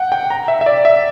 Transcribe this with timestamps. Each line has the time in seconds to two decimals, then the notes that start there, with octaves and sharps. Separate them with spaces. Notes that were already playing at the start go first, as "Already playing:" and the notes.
Already playing: F#5 G5
0.12 G5
0.30 A#5
0.48 E5
0.61 E5
0.66 D5
0.85 E5